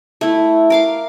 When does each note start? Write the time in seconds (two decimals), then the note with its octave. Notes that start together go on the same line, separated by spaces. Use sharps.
0.21 A3 E4
0.70 A#4 F5 D6